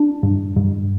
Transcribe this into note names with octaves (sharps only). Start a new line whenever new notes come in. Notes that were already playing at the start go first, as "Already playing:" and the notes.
Already playing: D4
G2
G2